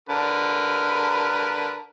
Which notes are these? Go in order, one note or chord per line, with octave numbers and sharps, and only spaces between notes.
D3 A#4 B4